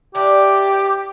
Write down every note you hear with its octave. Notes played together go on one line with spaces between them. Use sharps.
E3 D4 G4 D6